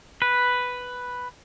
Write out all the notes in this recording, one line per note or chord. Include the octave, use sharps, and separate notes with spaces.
B4